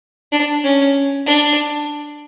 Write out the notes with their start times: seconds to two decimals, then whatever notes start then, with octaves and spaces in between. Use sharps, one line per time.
0.32 D4
0.64 C#4
1.26 D4